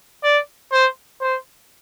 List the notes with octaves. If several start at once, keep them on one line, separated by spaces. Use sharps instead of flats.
D5
C5
C5